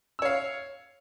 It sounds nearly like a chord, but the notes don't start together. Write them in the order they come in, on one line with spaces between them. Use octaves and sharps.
E6 C#5 F5